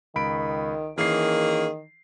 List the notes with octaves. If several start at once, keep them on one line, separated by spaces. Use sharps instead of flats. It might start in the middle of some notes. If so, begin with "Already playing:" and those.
C#2 D#3 B5 D7
D#3 E3 A#3 C#4 G#4 C7